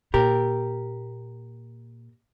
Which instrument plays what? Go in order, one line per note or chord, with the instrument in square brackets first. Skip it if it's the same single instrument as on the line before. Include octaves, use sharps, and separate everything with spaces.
[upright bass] A#2 [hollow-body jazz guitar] G4 A#4